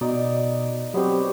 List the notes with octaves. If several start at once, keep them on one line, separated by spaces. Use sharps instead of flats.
B2 D#4 D5
F#3 B3 C4 G4 C#5